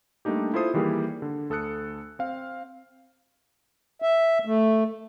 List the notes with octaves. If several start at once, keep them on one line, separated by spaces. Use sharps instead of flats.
G3 A3 A#3 D4 D#4 G4
E4 F4 A4 C5 D#6 C7
D#3 E3 G3 A#3 G4 G#4
D3
D2 A4 D#6 F#6 C#7
C4 F5
E5
A3